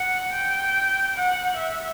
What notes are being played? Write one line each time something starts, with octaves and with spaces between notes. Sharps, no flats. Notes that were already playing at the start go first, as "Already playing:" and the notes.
Already playing: F#5
G5
F#5
E5